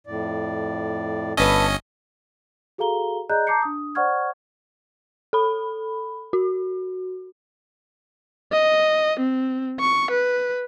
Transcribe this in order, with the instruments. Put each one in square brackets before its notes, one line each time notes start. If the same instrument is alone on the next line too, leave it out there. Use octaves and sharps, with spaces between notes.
[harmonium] F2 A2 D5
[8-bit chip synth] G1 C#4 D#5 [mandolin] A4 B4
[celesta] F#4 G#4 A4 F5 A#5 G7
G#4 D5 D#5 A#5 F#6 G6
A5 A#5 D6 G6 C7 C#7
D4 D#6
C5 D5 F#5 C#6 F6 G#6
[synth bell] A4 B5
F#4
[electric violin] D#5
C4
C#6
B4